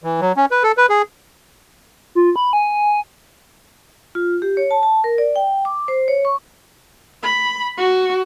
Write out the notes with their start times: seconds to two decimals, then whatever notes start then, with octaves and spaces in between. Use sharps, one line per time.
0.04 E3
0.21 F#3
0.37 C#4
0.51 B4
0.63 A4
0.77 B4
0.89 G#4
2.15 F4
2.36 B5
2.53 G#5
4.15 F4
4.42 G4
4.57 C#5
4.71 A5
4.83 A5
5.04 A#4
5.18 D5
5.36 G5
5.65 D6
5.88 C5
6.08 C#5
6.25 C#6
7.23 B5
7.77 F#4